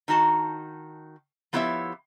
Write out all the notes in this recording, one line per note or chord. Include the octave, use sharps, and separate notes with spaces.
D#3 D#4 F#4 A5
F3 B3 E4 G4 C#5 E5